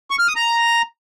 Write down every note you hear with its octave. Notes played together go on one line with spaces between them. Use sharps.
C#6
F6
D#6
A#5